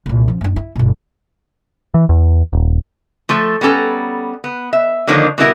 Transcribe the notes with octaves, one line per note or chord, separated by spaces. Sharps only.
C2 A#2
F3 C#4
F#1 D4
E4
G1 B2
E3
E2
D#1
F3 A3 A4
G3 B3 C#4 A4 A#5
B3
E5
D3 D#3 F3 A#3 D4 C#5
B2 G3 B3 E4 A4 A#4